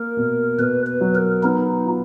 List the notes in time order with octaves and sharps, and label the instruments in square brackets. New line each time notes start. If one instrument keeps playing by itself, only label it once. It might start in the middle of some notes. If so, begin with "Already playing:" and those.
Already playing: [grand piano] A#3 [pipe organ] A#4
[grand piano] B2
[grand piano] B2 [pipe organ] B4
[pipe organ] B4
[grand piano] F#3
[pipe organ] A#4
[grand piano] B3 [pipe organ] D#4
[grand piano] F4